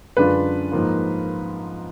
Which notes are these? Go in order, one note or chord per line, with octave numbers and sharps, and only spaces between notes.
F#2 D3 G#3 D4 F4 B4
G#2 F3 A#3 F4